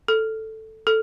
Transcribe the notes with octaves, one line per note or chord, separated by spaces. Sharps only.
A4
A4